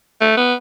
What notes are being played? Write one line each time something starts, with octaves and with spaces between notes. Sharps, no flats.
A3
B3